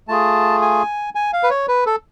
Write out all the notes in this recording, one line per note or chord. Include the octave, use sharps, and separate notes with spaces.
A3 F4 G#4 A5
G#5
G#5
F5
B4
C#5
B4
A4